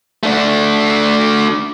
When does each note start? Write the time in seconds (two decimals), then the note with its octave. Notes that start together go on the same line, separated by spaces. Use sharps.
0.23 A3 D4